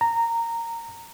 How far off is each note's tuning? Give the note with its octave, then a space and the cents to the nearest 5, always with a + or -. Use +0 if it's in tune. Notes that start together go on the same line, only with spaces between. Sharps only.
A#5 -15